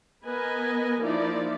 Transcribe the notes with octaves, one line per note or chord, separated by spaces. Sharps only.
B3 A#4 B4 D#5 G#5
F3 A#3 D#4 E4 D5